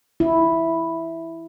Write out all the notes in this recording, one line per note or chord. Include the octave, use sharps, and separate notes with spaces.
E4